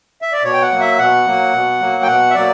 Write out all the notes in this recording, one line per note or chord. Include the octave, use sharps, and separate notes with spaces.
E5
D5
B2 C#5
G5
F#5
F#3 A#3
E5
B2 F#5
F#3 A#3
B2
F#3 A#3
G5
B2 F#5
E5
F#3 A#3 D5